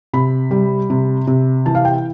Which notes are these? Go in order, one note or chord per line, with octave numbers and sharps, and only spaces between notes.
C3 B5
G3
C3
C3
E3 A5
F5
G5